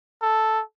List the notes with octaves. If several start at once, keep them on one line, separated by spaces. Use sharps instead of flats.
A4